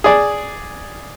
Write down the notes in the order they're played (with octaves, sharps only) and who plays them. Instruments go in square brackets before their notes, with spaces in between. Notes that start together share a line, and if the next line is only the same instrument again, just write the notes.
[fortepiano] G#4 D5